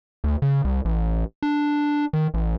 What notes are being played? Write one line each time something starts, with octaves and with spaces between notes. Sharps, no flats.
D2
C#3
C2
A1
D4
D#3
A1